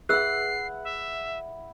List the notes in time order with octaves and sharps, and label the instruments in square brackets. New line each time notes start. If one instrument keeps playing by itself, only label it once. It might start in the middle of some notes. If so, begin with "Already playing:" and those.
[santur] E4 F#5 [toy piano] G#4 B4 E6 [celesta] F#6 [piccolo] C7
[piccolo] E5